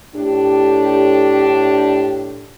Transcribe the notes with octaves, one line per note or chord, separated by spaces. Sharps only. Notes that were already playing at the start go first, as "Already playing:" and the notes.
A2 D4 G4